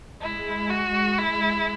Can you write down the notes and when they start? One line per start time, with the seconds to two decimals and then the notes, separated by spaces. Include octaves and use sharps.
0.21 G#3 E4
0.70 F#4
1.19 E4